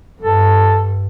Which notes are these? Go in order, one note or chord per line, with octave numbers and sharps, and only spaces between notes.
G2 A4